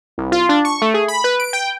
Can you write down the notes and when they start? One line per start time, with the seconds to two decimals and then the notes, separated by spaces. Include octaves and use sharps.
0.18 C2
0.32 F4
0.49 D4
0.65 C#6
0.82 A3
0.94 G#4
1.08 B5
1.24 B4
1.40 D7
1.53 G5